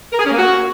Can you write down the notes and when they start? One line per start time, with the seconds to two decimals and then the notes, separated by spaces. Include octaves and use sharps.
0.12 A#4
0.18 G#4
0.25 C#4
0.31 A#3
0.37 F#4